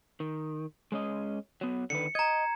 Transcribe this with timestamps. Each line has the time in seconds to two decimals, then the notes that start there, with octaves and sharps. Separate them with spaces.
0.20 D#3
0.92 G#3 C#4 D#5
1.61 F#3 B3
1.90 D3 D#3 B4 C#7
2.15 D#5 A#5 G#6